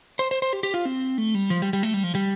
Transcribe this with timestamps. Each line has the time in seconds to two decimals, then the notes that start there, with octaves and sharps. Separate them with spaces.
0.19 C5
0.31 C5
0.42 C5
0.53 G4
0.63 G4
0.74 F4
0.85 C4
1.18 A3
1.35 G3
1.50 F3
1.62 G3
1.73 G3
1.83 A3
1.94 G3
2.04 F3
2.15 G3